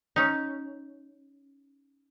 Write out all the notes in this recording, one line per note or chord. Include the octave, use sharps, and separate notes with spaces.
C#4 D#4